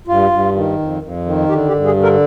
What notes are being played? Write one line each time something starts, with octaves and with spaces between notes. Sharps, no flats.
G2 F4
G2
D#3
F2
F2
D#3
D3 G4
G4
G2
G#4
D3
A#4